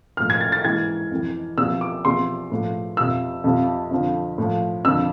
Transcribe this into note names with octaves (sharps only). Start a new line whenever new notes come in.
A2 F3 F6
G#6
A6
A6
G#2 E3 G#6
F2 E3
E2 C3 F3 E6
D6
E2 C3 F3 C6
A2 F3
F2 C3 F3 E6
F2 C3 F3
F2 D3 F3
A2 F3
F2 D3 F3 E6